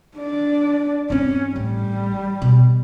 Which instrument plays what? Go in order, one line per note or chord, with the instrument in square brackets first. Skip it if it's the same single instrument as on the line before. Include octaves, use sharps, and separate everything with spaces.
[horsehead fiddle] D4 D5
[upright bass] G2 C4 [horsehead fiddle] C#4
[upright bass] A1 [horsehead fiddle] G3
[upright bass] B2